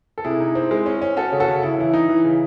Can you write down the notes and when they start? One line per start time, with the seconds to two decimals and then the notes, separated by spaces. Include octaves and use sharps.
0.18 A4
0.24 C3 E4 G#4
0.40 D#4
0.55 C4
0.71 G#3
0.86 C#4
1.02 C#4
1.17 C#4 F#4 A4
1.32 C#3
1.40 F#4 A4
1.48 C#3
1.63 C#3 E4
1.78 E3 E4
1.93 D#4
2.09 E3
2.25 C#3